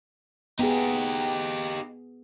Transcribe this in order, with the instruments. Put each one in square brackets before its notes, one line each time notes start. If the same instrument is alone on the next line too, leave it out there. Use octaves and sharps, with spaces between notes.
[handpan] B3 G#4 [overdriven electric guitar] D#4 G4